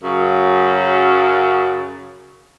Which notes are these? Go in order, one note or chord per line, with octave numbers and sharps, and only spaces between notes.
F#2 C#3